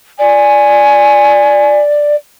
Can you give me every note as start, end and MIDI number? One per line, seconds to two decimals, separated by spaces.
0.19 2.15 74
0.19 1.77 80